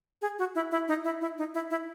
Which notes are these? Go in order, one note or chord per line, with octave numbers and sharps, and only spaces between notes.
G#4
F#4
E4
E4
D#4
E4
E4
D#4
E4
E4